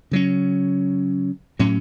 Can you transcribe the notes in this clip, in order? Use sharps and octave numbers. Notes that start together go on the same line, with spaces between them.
C#3 F#3 C#4
A2 F#3 C#4